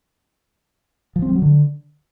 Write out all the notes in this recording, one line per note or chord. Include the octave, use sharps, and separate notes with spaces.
F3
C4
G3
F#3
D3